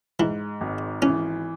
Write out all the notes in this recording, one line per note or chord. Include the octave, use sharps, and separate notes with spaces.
G#2 E3
G#1
E3 C#4